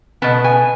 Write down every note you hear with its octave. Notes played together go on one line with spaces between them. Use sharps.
B2 B3 A5
G#5